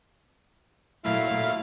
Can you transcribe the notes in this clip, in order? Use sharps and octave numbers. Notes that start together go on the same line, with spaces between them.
A#2 F#3 A3 E4 F5